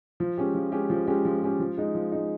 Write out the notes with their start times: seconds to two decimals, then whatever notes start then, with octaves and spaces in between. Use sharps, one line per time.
0.20 F3
0.37 G#3 C#4 G4
0.55 F3
0.72 G#3 C#4 G4
0.90 F3
1.07 G#3 C#4 G4
1.25 F3
1.42 G#3 C#4 G4
1.59 F3
1.78 G#3 D#4
1.94 F3
2.12 G#3 D#4